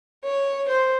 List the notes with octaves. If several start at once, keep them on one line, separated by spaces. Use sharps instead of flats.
C#5
C5